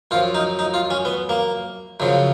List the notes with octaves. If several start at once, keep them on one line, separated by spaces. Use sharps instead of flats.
F#2 F3 F4
D#4
D#4
F4
C#4
B3
A#3
F#2 C#3 F3 F#3